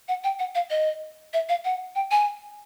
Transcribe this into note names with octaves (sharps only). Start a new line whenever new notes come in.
F#5
G5
F#5
F5
D#5
E5
F5
F#5
G5
G#5